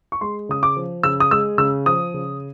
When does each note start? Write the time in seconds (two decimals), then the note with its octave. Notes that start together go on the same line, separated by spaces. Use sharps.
0.12 C#6
0.21 G#3 C6
0.49 C#3 D#6
0.63 D6
0.77 F3
1.03 C#3 E6
1.20 D#6
1.31 G#3 E6
1.58 C#3 E6
1.86 F3 D#6
2.14 C#3